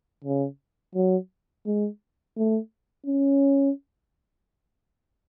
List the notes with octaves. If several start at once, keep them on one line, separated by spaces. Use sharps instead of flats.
C#3
F#3
G#3
A3
C#4